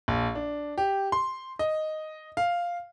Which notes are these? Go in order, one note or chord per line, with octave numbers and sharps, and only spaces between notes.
A#1
D4
G4
C6
D#5
F5